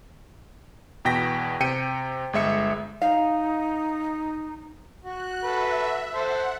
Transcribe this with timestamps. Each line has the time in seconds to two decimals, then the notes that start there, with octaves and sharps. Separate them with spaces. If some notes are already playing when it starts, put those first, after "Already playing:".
1.05 E2 B2 G5 A#6 B6
1.60 C3 G5 C#7 D#7
2.33 G1 G#3 E5 C#7
3.02 D#4 F5
5.04 F#4 F#6
5.44 A4 B4 E5
6.15 A4 C5 F#5